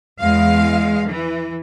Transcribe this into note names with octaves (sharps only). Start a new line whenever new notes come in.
E2 G#3 F5
E3